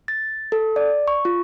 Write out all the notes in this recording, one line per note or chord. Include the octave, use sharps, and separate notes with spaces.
A6
A4
D5
C#6
F4